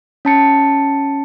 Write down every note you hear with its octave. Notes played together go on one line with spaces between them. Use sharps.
C#4 A5 C#7